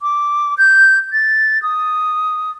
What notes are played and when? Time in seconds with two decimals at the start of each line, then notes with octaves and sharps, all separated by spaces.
0.02 D6
0.58 G6
1.12 A6
1.63 D#6